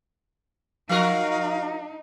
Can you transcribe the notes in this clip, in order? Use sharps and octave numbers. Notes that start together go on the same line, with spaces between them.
F3 D#4 F#4 A#4 F5